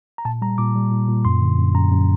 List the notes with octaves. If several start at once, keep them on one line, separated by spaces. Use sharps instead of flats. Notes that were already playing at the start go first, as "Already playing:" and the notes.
A#5
A#2 A5
G3 A#5
A#2 D6
G3
A#2
A#2
F#2 C6
D3
F#2
F#2 A#5
F#2